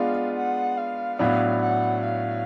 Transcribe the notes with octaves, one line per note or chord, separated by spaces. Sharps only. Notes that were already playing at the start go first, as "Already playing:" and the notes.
Already playing: G#3 B3 D4 F4 F5
F#5
F5
A2 F#3 B3 D4 F5
F#5
F5